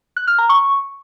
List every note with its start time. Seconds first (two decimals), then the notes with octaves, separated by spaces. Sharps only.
0.17 F#6
0.27 F6
0.38 A#5
0.49 C#6